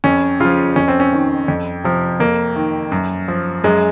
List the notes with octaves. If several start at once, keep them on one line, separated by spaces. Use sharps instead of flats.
F2 C#4
C#3 F3 F4
F2 C#4
C4
C#4
D#3
F2
C3 F3
F2 A#3
D#3
F#2
F3
F#2 G#3